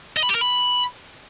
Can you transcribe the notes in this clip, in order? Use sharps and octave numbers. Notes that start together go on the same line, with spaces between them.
D#5
B5
G4
A#4
B5